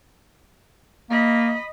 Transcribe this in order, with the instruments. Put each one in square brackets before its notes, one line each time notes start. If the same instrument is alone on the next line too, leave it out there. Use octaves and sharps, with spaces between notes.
[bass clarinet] A#3 [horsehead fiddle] D#5 B5